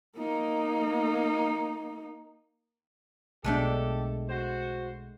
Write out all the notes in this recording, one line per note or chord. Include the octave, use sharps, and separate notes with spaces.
A#3 D#4
B1 B2 G#3 A3 D4 G4 A4
F#4 C5